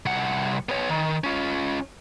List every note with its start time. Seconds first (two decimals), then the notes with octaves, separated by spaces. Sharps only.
0.06 C2 F#5
0.69 B3 C#5
0.89 D#3
1.24 C#4 F4